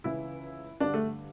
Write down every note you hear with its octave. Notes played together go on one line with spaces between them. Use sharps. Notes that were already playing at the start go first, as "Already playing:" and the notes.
C#2 C#3 E3 E4
G2 D3 D4
A3